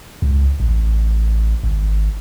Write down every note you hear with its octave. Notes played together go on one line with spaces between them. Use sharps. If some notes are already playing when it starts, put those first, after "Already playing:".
C#2
A1
G#1